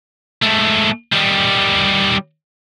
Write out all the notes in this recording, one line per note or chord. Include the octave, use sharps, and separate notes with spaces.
G#2 A3
D#3 G3